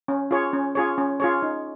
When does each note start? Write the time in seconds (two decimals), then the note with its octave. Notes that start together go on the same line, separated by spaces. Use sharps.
0.08 C#4
0.31 F4 G#4 C#5
0.53 C#4
0.75 F4 G#4 C#5
0.98 C#4
1.20 F4 G#4 C#5
1.42 D#4